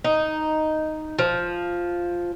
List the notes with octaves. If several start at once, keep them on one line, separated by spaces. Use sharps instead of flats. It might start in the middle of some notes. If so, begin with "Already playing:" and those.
D#4
F3